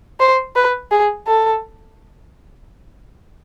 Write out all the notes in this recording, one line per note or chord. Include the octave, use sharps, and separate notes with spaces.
C5
B4
G#4
A4